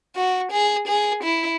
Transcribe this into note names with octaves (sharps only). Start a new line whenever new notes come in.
F#4
G#4
G#4
E4